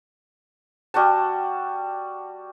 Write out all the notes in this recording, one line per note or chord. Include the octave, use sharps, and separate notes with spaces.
G3 F#4 F#5 A5